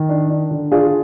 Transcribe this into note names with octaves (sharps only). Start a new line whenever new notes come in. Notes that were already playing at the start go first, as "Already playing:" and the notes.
Already playing: D#3
D4
D4
D3
D4 F4 G#4